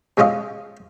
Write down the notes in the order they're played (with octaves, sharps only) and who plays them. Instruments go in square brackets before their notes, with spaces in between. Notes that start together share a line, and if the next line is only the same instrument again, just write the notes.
[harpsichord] C3 G#3 C#4 F4 D#5